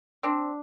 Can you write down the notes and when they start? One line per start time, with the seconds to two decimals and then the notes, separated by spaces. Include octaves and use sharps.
0.23 C4 D4